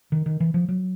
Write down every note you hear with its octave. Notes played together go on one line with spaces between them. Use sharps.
D#3
D#3
E3
F3
F#3